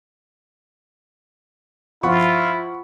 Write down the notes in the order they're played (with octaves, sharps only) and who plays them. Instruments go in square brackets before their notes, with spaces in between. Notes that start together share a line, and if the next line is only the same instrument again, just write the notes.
[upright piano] F3 [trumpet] E4 [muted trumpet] F4 [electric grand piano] F#5 B5 C#6